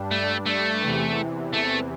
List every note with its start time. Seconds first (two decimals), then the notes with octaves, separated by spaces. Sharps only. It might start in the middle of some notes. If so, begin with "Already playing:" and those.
Already playing: G2 G3 D4
0.11 A3
0.46 A3
0.81 E2 C3 E3
1.53 A3